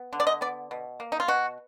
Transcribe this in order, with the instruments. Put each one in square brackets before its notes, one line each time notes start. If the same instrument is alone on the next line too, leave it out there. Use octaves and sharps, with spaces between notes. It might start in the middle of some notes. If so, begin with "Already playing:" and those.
Already playing: [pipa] B3
D3
D5
D#5
B3 D5
B2
A#3
D#4
F4
B2 F#4